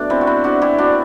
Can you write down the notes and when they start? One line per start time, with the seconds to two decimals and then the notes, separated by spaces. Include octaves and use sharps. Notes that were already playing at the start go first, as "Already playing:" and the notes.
Already playing: B2 A3 D4
0.10 C4 E4
0.21 F#4
0.27 C4 E4
0.44 D4 F#4
0.62 E4 G4
0.79 D4 F#4